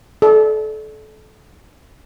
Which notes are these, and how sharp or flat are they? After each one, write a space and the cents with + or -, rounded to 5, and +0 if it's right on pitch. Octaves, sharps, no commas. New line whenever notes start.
A4 -30 D5 +0